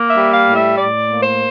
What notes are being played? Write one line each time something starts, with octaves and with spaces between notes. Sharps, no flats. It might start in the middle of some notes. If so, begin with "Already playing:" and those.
Already playing: A#3
E5
G3
F5
A2
E5
A2 D5
A#3
C5